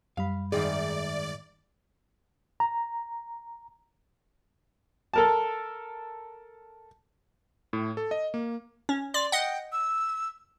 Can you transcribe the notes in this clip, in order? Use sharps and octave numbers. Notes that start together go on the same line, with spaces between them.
F#2 G3 F5 B5
G#2 D#3 G#4 D5 E5
A#5
A4 A#4 A5
A2
A4
D#5
A#3
C#4
D5 C6
D#5 F#5 G5
E6